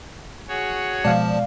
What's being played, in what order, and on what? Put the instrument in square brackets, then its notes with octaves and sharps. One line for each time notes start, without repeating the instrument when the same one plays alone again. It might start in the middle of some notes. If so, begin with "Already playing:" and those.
[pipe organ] F#4 G#4 C#5
[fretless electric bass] B2 G#3 [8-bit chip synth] F3 A5 [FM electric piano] D5 F5